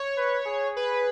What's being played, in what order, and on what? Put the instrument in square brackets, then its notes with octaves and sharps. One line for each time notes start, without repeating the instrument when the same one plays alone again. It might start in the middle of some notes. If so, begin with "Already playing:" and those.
Already playing: [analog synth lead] C#5
[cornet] B4
G#4
[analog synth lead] B4